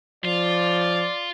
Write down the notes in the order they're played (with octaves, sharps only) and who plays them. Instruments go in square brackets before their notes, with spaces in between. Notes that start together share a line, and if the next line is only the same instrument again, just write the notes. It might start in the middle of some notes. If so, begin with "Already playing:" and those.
[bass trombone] F3 [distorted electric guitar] F4 [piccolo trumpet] D5